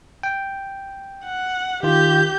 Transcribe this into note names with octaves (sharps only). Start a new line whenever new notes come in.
G5
F#5
D#3 F4 G4 G6